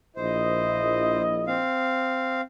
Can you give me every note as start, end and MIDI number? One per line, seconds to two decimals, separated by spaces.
0.16 1.61 34
0.16 1.61 64
0.16 1.22 72
0.16 1.61 75
1.47 2.41 60
1.47 2.41 77